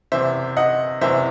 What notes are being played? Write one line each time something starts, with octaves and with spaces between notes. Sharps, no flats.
F#1 E2 C3 E3 C5 E5
D#5 F#5
F#1 E2 C3 E3 C5 E5